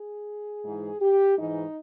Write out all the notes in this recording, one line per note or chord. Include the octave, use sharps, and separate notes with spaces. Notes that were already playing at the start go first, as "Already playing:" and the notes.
Already playing: G#4
G#2 E3
G4
G#2 E3 D#4